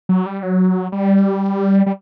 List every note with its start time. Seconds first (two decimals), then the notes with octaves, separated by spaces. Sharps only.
0.09 F#3
0.26 G3
0.43 F#3
0.92 G3
1.86 G3